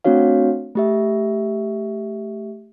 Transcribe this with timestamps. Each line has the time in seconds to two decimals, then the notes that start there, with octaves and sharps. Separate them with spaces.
0.04 A3 C4 D4 F#4 C#5 F5
0.75 A3 G4 E5